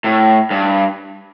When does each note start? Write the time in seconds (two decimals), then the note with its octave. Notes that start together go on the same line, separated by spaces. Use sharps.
0.04 A2
0.50 G2